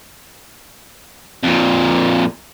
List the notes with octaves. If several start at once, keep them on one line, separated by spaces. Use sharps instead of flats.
F2 A#2